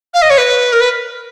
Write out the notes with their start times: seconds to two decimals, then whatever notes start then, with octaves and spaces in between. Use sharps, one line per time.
0.13 F5
0.22 D#5
0.30 C#5
0.37 B4
0.72 A#4
0.80 B4